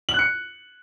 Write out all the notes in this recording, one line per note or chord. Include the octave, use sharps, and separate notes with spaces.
F#7
F#6
C#7